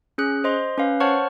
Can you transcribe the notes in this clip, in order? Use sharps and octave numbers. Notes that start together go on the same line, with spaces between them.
C#4 G#4 F#6
C5 D#5 C6
C#4 B4 F5
C5 C#5 F#5 A5 C#6 F6